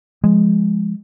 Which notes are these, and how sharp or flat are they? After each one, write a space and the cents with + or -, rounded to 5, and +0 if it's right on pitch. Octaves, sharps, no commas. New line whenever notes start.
F3 -5 G#3 +0